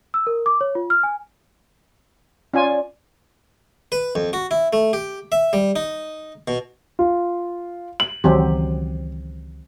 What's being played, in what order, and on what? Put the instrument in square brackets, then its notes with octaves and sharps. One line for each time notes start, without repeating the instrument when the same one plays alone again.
[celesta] E6
A#4
D6
C#5
F4
F6
G#5
[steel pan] C#4 F4 G#5 [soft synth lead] D5
[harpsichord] B4
F2
F#4
E4
A3
G4
E5
G3
D#4
B2
[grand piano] F4
F#7
[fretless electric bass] C#2 D#3 E3 [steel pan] F#3 C4 G4